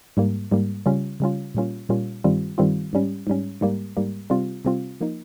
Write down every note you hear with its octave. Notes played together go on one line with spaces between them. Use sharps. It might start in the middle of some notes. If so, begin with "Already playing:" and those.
G#2 G3 A#3
G#2 G3 A#3
C#3 G3 C#4 F4
C#3 G3 C#4 F4
A#2 G3 A#3 C#4 F4
A#2 G3 A#3 C#4 F4
G2 D#3 G3 C4 F4
G2 D#3 G3 C4 F4
G#2 G3 C#4
G#2 G3 C#4
G#2 G3 A#3
G#2 G3 A#3
C3 G3 C4 F4
C3 G3 C4 F4
F3 A#3 D#4